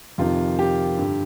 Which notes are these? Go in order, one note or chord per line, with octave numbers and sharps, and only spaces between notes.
F2 C3 D#3 F4
G4
G2 D3